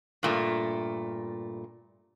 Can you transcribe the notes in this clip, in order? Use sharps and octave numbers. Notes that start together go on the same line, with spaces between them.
G2 A#2 A3